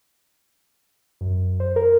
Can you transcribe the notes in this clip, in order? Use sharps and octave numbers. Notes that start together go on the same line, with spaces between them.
F#2
C5
A#4